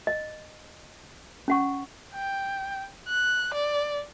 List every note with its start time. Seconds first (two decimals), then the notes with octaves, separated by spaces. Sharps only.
0.07 D#5
1.48 C#4 F#5 C#6
2.14 G5
3.08 F#6
3.54 D5